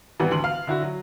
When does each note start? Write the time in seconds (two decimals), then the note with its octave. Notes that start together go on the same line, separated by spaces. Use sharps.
0.20 G#1 E3 G3 B3 F#5
0.31 D2 C6 F#7
0.44 F5
0.67 D3 E4 F#4
0.82 F#3